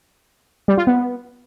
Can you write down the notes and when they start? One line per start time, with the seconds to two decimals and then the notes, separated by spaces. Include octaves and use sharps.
0.68 G3
0.78 F4
0.87 B3